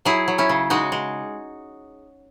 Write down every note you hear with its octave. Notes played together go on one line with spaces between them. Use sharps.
F#3 E4 G#4
F#3
C#4 E4
C#3
G#3 D#4 F#4
G#3